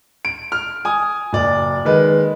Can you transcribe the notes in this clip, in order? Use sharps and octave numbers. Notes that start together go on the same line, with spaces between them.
D7
F6
G#5 D#6
F#1 D5
D#3 G#3 B4